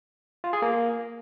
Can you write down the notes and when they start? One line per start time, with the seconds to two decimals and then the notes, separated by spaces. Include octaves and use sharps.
0.44 F4
0.53 G#4
0.62 A#3